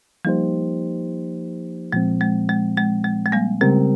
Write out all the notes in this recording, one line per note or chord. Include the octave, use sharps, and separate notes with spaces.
F3 G3 A#3 D#4 G4 C5
A#2 F3 G#3 C4
G#3
G#3
G#3
G#3
G#3
G3 A#3
C#3 G3 G#3 C4 G4 A#4